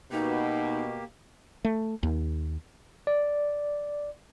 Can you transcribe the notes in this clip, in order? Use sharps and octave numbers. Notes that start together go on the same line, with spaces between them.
B2 A#3 D#4 G4
A3
D#2
D5